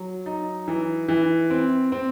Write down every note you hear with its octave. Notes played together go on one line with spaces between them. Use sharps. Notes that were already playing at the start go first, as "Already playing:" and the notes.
Already playing: F#3
D#4
E3
E3
C4
C4